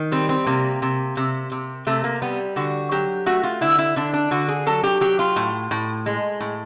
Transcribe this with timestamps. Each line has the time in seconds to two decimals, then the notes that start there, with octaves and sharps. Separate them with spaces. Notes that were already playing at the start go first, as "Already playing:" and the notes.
Already playing: D#3
0.12 G3 C4
0.29 C4
0.47 C3 A#3
0.82 C3
1.17 C3
1.52 C3
1.87 C3 A3
2.04 A#3
2.22 G3 B3
2.56 D3 F#4
2.91 F#3 G4
3.26 A3 F#4
3.44 F4
3.61 D3 E4
3.78 E4
3.96 D3 D4
4.14 D4
4.31 D3 F#4
4.48 G#4
4.66 F#3 A4
4.84 G4
5.01 F#3 G4
5.19 F4
5.36 A2
5.71 A2
6.06 G#3
6.40 A2